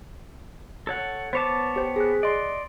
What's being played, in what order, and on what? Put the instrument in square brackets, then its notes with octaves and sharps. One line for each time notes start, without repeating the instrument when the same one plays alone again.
[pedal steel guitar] A4 C#5 F#5
[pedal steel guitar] B3 C#5 A5 [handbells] C5 D6
[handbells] G4 C5
G#4 F#6
[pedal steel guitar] D5 [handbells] D#5 C6